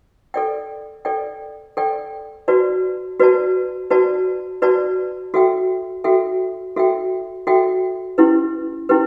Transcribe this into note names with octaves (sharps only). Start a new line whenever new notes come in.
A4 D5 G5
A4 D5 G5
A4 D5 G5
F#4 B4 D5 A5
F#4 B4 D5 A5
F#4 B4 D5 A5
F#4 B4 D5 A5
F#4 A4 E5 G5
F#4 A4 E5 G5
F#4 A4 E5 G5
F#4 A4 E5 G5
C#4 E4 G4 B4
C#4 E4 G4 B4